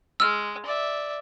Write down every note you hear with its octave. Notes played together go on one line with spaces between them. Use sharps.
G#3 E6 F6
D5 E5